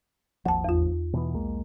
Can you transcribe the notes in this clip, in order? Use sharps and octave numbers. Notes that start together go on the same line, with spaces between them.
G#1 D#2 F3 F#5 A5
E2 F4
B2 E3 B3
B1 G#3 A#3